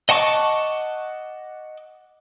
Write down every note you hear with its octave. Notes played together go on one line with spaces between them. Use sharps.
D#5 F#5 A5 C#6 D6